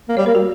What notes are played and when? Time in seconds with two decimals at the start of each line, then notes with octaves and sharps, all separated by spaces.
0.09 A#3
0.17 G3 C#5
0.26 A#3 A#4
0.35 G3 F#4